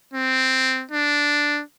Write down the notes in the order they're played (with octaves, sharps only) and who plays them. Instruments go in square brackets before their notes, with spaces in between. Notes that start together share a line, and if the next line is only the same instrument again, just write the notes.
[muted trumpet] C4
D4